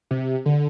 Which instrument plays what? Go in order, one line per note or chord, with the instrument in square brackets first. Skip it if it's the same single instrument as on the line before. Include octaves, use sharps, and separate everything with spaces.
[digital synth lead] C3
D3